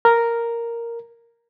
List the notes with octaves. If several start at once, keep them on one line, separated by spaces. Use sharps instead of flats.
A#4